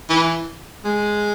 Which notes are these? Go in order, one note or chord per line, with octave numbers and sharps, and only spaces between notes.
E3
G#3